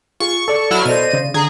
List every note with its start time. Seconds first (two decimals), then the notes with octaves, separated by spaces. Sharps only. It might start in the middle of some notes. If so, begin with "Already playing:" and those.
0.20 F4 G#4 C#6
0.48 A4 D5 A5
0.71 F#3 E4 F6
0.85 B2 A4 C5 D5 D#5 D#7
1.13 C#3
1.34 D3 G#4 A#5